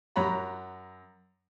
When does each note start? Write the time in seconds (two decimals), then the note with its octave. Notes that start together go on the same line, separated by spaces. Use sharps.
0.16 F#2 C#5 F#5 A#5 B5